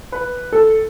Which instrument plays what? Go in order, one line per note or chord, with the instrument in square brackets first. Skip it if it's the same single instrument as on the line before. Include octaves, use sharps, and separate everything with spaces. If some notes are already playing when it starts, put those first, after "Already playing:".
[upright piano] B4
A4